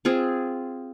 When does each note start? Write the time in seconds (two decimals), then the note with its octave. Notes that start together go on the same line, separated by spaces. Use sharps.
0.05 C4 F4 G#4